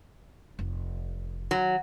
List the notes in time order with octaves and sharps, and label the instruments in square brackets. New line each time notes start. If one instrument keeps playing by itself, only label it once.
[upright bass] F1
[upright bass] D#3 [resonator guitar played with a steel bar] F#3